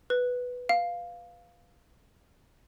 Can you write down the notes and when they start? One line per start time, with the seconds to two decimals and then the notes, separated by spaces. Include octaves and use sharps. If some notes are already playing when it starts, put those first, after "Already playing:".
0.10 B4
0.69 F5